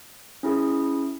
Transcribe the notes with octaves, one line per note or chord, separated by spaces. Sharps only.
C#4 E4 G#4